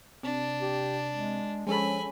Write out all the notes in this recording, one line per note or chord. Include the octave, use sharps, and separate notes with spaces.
C3 D4
G4
G#3
F3 G#3 C#4 A4 G#5 B5